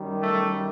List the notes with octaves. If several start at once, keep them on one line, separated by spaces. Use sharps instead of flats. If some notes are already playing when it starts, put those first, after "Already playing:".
Already playing: F#2 D#3 G3
A3